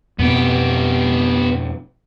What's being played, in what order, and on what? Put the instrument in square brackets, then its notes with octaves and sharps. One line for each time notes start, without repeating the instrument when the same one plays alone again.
[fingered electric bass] F2 B2 C4 [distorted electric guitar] B3 G4